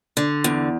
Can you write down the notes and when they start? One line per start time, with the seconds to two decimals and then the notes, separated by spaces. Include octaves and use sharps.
0.17 D3
0.44 E2